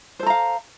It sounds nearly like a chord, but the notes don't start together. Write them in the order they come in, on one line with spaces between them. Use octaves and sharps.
C5 A4 A#5 F5